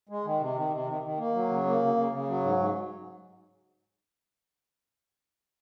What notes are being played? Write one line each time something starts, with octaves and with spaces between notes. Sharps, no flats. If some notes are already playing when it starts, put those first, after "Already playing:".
G#3
D#3
C3
D#3
C3
D#3
D#3
A#3
F#3
C#3
A#3
C#3
C#3
C#3
F#3
G#2
G#2